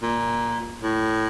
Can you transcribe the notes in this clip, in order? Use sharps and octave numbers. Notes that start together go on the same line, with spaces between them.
A#2
A2